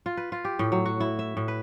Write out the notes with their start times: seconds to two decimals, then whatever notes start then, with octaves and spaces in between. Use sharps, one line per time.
0.06 F4
0.17 B4
0.32 F4
0.45 G4
0.59 A2
0.72 F#3
0.86 F#4
1.00 E4
1.19 E5
1.37 A2
1.48 B4